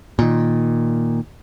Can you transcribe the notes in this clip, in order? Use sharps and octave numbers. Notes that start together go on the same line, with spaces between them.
A#2 D#3